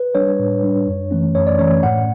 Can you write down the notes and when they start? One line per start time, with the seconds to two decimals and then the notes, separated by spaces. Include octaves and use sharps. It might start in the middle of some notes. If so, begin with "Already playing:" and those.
Already playing: B4
0.15 G3 D4 C#5
0.39 A2
0.63 G3 D4
0.87 F#2
1.11 E3 A3 C#4
1.35 F#2 C#5
1.47 D5
1.59 E3 A3 C#4 C#5
1.83 A2 F#5